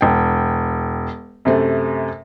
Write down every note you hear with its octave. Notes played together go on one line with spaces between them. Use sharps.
E1 G5
F#2 C3 A3